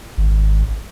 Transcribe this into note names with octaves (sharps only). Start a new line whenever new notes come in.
G#1